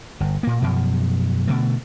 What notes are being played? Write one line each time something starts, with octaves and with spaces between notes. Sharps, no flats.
G1
A#2 A#3
F#2 B2 F3
B2 D3 A3